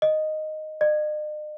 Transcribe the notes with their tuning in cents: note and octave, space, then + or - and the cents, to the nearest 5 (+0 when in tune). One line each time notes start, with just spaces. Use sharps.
D#5 -5
D#5 -45